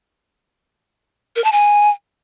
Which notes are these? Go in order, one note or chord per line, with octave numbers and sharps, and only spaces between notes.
A#4
A5
G#5